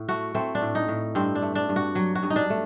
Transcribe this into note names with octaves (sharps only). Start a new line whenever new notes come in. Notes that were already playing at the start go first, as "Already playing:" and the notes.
Already playing: A2
A3 F#4
A3 C4
D4
A2
D#4
A2
G2 C4
D4
A3
D4
G2
F#4
F#3
F#4
G2
D#4
D4
A3